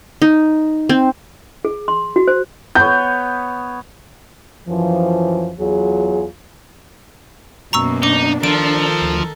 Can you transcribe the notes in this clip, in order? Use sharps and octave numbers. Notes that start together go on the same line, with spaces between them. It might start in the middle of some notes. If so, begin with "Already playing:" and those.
D#4
C4
G#4
C6
F#4
C5
B3 C#5 G6
F#2 E3 F3
E2 F#3 F4 G#4
F#2 B2 A#3 A#5 C#6 E6
D4 D#4 D6
D#3 F3 A4 A#4 D7
D2